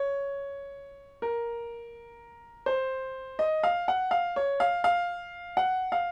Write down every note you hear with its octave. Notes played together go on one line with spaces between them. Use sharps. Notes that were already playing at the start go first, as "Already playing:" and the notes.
Already playing: C#5
A#4
C5
D#5
F5
F#5
F5
C#5
F5
F5
F#5
F5